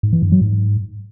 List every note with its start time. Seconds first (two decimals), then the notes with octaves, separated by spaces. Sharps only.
0.03 G#2
0.13 E3
0.22 G2
0.32 F#3
0.41 G#2